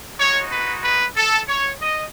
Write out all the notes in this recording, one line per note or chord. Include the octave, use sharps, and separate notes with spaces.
G#3 D#4 F#4 C#5
B4
B4
A4
C#5
D#5